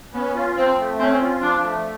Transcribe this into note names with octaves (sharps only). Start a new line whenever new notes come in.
B3 C#4
F4
F3 C4
A3
C4 C#4
F4
F3 D4
A3